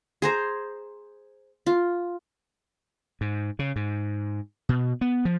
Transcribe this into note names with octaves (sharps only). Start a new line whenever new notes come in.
G#4 C5 A#5
F4
G#2
C#3
G#2
B2
B3
F3